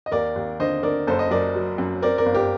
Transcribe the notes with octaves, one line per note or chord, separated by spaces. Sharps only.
D#5
D#2 A#4 D5
D#2
D3 C5 D#5
D3 A#4 D5
F#1 A4 C5
D#5
F#2 A#4 D5
F#3
F#2
C4 A#4 D5
A#4 D5
G1
G4 A#4